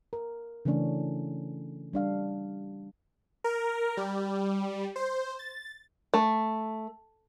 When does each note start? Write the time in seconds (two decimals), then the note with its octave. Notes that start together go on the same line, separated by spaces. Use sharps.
0.13 A#4
0.65 C#3 E3 A3 C#4 D4
1.93 G3 D4 F5
3.44 A#4
3.97 G3
4.96 C5
5.39 A6
6.14 A3